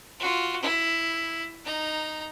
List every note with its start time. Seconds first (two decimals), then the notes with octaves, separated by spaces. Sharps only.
0.20 F4 F#4
0.62 E4
1.65 D#4 A#5